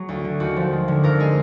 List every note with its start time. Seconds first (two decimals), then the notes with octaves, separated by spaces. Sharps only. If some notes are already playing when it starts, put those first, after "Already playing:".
Already playing: F#3 F#4 G#4
0.09 D2
0.25 D3
0.40 D#2 F#4
0.56 F3
0.72 G#3
0.88 D3
1.04 F2 A#4
1.20 G#3 G#4